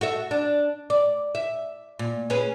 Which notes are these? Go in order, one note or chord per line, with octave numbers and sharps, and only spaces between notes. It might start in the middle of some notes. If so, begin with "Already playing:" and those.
F#4 A4 E5
D4
D5
E5
A#2
C#4 G#4 B4